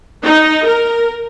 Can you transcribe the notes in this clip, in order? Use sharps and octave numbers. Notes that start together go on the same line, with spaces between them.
D#4
A#4